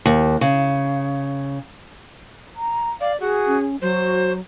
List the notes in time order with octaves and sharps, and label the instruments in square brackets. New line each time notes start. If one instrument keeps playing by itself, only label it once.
[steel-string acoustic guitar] D#2
C#3
[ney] A#5
[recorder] D5 [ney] F5
[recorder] F#4 [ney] G#4
[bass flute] C#4
[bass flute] F#3 [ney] F#4 [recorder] C5